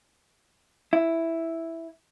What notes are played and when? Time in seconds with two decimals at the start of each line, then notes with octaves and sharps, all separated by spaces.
0.93 E4